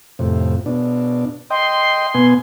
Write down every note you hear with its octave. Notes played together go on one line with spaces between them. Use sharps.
F2 A2 C3
B2 D4
D#5 G5 C6
B2 B3 G#5